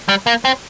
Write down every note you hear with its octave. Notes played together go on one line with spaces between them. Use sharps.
G3
A#3
C4